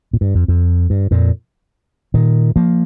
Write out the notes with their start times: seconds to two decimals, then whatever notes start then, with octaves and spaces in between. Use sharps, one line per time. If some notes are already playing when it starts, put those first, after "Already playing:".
0.13 A#2
0.21 G2
0.35 F2
0.48 F2
0.90 G2
1.11 F2 A#2
2.14 A#2 D#3
2.56 F3 A#3